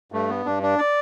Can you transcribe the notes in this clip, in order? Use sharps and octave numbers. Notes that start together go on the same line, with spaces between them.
G2 A3
B3
G2 D4
D4
D5